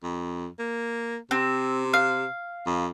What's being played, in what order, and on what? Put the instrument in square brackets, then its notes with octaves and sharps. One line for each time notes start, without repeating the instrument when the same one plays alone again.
[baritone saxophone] F2
A#3
[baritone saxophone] C3 [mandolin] C4
[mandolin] F5
[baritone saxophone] F2